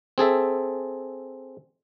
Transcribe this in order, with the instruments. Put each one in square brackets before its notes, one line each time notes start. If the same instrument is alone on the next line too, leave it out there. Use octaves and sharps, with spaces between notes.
[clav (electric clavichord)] C4 G#4 A4 E5